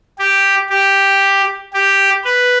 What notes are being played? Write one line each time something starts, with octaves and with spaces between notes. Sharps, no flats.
G4
G4
G4
B4